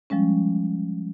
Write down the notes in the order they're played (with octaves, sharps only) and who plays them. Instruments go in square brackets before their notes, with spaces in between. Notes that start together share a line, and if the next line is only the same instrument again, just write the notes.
[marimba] F3 G3 G#3 C#4